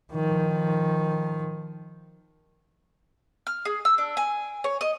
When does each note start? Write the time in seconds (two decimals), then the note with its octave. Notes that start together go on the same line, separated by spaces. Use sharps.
0.12 D#3 F3
3.47 F6
3.65 G#4
3.85 E6
3.98 D4
4.17 G#5
4.64 C#5
4.81 D#5